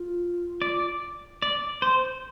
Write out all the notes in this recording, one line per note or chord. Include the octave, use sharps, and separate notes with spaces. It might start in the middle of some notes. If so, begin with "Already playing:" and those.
Already playing: F4
D5
D5
C5